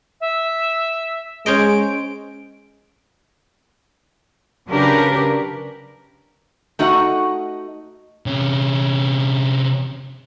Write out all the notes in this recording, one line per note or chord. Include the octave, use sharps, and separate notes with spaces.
E5
G#3 C#4 C5 D#5 D7
C#3 F#3 D4 G4 A#4 B4
A3 D#4 F#4 D#5 F5 F#5
C3 C#4